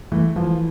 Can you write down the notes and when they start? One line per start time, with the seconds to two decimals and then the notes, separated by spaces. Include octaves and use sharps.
0.12 E3 A3
0.36 E3 F3